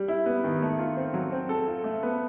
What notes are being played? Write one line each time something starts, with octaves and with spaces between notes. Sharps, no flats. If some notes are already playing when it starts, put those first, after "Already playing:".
Already playing: G3
E4
B3
D#3
A3
F4
C4
F#3
C4
A4
F4
A3
B3